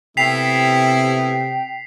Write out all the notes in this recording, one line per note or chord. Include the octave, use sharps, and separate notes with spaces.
C3 A3 B3 E4 G5 B6 C7 F7